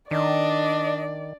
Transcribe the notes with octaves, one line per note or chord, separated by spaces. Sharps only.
D#3 D4 D5 D#5